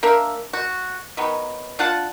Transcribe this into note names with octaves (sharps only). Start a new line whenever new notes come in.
A#3 D4 A#4 E5
F#4
D#3 F#3 B3
D4 F4 F#5 A5